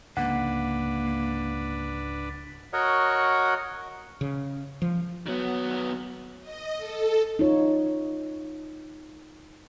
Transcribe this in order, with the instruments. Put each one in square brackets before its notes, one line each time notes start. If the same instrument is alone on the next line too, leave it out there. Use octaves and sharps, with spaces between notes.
[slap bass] C#2 G#2 D3 [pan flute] A#3 [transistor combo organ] D4 B4 [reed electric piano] F#5
[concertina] F#4 A#4 C#5 D#5 F#5
[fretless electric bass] C#3
F3
[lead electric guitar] D#3 B3 [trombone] F#3
[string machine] D#5
A4
[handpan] D#4 F4 C#5